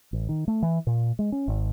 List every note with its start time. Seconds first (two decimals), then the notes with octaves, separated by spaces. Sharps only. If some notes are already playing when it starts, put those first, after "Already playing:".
0.13 A1
0.29 D#3
0.48 A3
0.62 E3
0.87 A#2
1.19 G#3
1.32 C#4
1.48 G#1